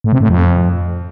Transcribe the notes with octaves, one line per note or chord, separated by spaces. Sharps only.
A2
C3
A2
F2